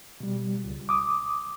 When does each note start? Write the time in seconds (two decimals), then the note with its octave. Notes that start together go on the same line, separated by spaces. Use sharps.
0.20 B2 G3
0.64 C#2
0.89 D6 D#6